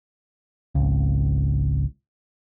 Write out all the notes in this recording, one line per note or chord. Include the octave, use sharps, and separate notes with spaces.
G#1 C#2